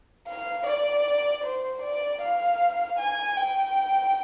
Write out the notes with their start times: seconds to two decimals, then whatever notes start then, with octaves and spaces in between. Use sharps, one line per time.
0.28 F5
0.66 D5
1.44 C5
1.82 D5
2.21 F5
2.98 G#5
3.36 G5